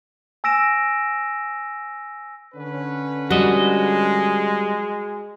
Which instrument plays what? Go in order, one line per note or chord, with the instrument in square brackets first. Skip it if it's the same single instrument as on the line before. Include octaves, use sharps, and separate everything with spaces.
[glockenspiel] G#5 E6 A#6 D7 E7
[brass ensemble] D3 C#4 B4
[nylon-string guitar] G3 [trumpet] G#3 [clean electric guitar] F#4 D#5